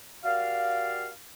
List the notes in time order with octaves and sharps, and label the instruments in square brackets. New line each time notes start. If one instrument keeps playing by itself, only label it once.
[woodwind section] F#4 G4 A#4 D5 F5